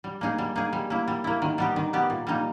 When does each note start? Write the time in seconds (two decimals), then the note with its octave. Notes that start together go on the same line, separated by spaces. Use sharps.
0.04 G3
0.21 A#3 D#4 G#4
0.38 G3
0.56 A#3 D#4 G#4
0.73 G3
0.90 A#3 E4
1.08 G3
1.24 A#3 E4
1.42 D#3
1.58 G3 B3 G4
1.76 D#3
1.93 G3 B3 G4
2.10 A#2
2.27 G3 A#3 D#4